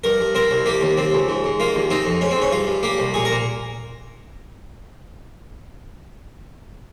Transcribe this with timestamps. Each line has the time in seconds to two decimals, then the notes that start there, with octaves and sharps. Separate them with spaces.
0.04 G2 A#4
0.20 G2
0.35 C4 A#4
0.51 C2
0.66 A#3 G4
0.81 D#2
0.98 C4
1.13 C#2
1.29 G#2
1.44 G#2
1.60 A#3 F4
1.75 D#2
1.90 C4 D#4
2.06 F2
2.21 G#2 C#4
2.31 C4
2.36 G#2
2.42 C#4
2.52 G2 F4
2.67 G2
2.83 A#3 G4
2.98 C2
3.14 A#2 G#4
3.25 A#4
3.30 A#2